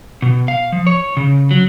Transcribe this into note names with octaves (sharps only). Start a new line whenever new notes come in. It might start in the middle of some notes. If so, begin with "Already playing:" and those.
B2
F5
F3
C#5
C#3
F#3